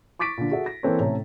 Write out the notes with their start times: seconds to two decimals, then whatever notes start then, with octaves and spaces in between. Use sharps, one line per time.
0.19 C#6 D6 A6 B6 D7
0.37 A#2 D3
0.51 F#4 G#4 A4 E5
0.66 A#6
0.83 E3 A#3 C4 A4 B4 C#5
0.99 A2 C3 A3 C#4 A4 A#5